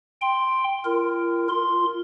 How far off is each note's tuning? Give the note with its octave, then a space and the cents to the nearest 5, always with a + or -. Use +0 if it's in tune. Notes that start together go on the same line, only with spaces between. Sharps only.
G5 +5 C6 +0
F4 -35 A#4 +0
F4 +0 C6 +0